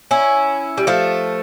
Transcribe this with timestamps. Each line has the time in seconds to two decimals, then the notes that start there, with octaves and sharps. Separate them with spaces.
0.11 C#4 E4
0.78 G3
0.87 F3 A3